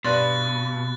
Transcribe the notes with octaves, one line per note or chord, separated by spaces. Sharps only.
G2 B2 B4 D5 C6 F#6 A6